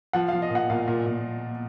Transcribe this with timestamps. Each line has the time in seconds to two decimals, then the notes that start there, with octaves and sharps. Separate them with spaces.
0.13 F3 F#5
0.28 F5
0.33 F3
0.42 D#5
0.50 A#2 F#5
0.70 A#2 F5
0.88 A#2
1.06 A#2